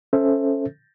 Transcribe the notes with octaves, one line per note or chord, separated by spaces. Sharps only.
C#4 A4 C5 E5